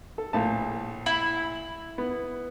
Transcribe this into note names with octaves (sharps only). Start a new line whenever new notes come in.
A4
A#1 A2 A5
E4
B3